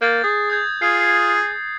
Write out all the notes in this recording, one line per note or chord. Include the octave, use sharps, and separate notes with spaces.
A#3 G6 A6
G#4
D#6 G6 G#6
F4 G#4 C7